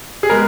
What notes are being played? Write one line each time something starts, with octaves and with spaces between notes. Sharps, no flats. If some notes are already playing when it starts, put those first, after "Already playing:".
G#4
G#3 B3 A#4